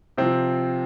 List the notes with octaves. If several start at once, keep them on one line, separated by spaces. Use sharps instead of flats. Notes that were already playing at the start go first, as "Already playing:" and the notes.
C3 F3 C4